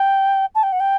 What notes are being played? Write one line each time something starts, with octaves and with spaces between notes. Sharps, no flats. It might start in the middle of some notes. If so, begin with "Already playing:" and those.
Already playing: G5
A5
G5
F#5
G5